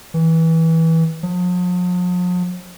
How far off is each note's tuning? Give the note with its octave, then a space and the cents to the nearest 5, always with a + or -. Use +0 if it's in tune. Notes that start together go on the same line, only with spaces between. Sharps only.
E3 -20
F3 +45